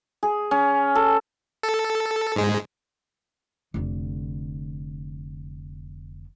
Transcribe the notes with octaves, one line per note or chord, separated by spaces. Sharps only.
G#4
C#4
A4
A4
G#2 G#3
F1 D3